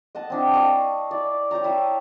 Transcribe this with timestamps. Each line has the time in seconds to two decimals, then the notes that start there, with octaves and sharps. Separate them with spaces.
0.15 D#5 F#5 A5
0.30 C4 D4 E4
0.53 D#5 F5 A5 C#6
1.11 E4 D5
1.51 C#5 G5 A5 A#5
1.64 E4 E5 C#6 D#6